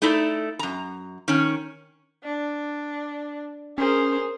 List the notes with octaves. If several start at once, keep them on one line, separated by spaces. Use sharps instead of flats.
A3 D#4 E4 A4 D5
F#2 A#5
D#3 C#4
D4
C#4 G#4 A#4 C5